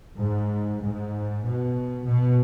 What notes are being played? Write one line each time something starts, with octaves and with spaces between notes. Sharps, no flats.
G#2
G#2
B2
B2